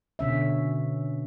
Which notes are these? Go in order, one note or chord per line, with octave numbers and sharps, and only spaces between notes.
B2 D3 C#4 E5